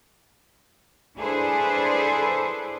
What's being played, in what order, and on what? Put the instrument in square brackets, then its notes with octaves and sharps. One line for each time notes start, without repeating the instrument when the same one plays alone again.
[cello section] D4 E4 G#4 A4 B4 C5